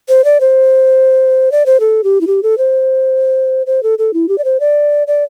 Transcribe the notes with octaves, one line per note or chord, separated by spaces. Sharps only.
C5
D5
C5
D5
C5
A4
G4
E4
G4
A4
C5
C5
A4
A4
E4
G4
D5
C5
D5
D5